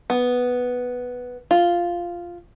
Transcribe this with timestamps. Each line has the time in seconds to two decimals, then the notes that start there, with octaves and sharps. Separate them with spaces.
0.10 B3
1.51 F4